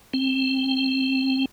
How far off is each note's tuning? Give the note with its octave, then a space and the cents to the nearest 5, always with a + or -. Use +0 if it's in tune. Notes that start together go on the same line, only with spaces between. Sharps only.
C4 +20